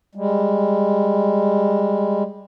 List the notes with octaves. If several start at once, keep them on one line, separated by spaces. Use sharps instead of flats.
G3 G#3